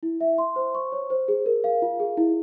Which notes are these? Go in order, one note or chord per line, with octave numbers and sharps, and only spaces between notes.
E4
E5
C6
C5
C#6
C#5
C5
G#4
A#4
F5
F4
G#4
E4